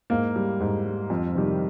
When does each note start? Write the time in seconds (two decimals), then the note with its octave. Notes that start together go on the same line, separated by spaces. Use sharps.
0.10 G#2 A#3
0.36 G3
0.60 G#2
0.85 G3
1.10 F2
1.35 C3 D#3 G3